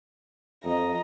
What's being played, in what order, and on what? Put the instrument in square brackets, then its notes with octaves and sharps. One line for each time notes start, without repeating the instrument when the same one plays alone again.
[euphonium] F2 [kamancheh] D#5 A#5